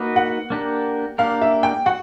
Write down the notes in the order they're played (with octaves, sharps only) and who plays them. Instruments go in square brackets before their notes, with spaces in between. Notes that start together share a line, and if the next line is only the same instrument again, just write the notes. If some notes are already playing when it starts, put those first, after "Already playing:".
Already playing: [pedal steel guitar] A#3 D#4 F#4 B4
[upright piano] F#5
[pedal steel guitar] A#3 D4 G4 A#4
[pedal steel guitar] A#3 D4 G4 A#4 [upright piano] F5
[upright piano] E5
G5
[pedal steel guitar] F#4 [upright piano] F#5